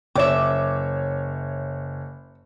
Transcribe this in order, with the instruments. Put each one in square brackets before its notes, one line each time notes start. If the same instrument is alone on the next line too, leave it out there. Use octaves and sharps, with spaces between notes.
[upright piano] F#1 C#5 [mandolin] E5 D6